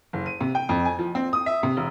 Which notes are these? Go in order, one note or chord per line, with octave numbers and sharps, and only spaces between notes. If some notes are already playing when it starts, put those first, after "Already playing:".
F#1
D#7
C3
G5
F2
G#5
F3
C4
D#6
E5
C3
E1